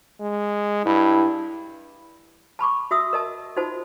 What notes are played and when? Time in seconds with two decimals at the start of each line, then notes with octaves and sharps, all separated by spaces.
0.20 G#3
0.86 G2 E4
2.59 A5 B5 C#6 D6
2.91 F#4 E5 D#6 E6
3.13 A#4 D#5 A5
3.56 D#4 F4 F#4 C5 A5